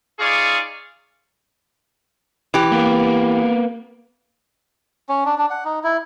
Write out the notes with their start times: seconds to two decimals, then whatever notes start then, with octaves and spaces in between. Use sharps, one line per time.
0.19 D#4 F4 G#4 D5 F5 C#6
2.54 E3 G4
2.72 A#3 B3
5.09 C#4
5.26 D4
5.38 D4
5.50 F#5
5.65 D#4
5.84 E4